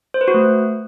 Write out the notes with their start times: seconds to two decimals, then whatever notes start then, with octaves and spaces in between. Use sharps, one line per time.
0.14 C5
0.21 B4
0.28 F#4
0.34 A3